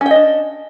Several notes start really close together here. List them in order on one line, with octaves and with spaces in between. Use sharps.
C#4 G5 D#5 D4